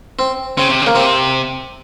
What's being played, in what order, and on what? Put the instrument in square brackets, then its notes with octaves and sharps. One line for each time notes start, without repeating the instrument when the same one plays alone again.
[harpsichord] C4
[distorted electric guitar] C#3 [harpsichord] C4
[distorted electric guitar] C3
C#3
[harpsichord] A#3
[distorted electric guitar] C3 [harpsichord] C4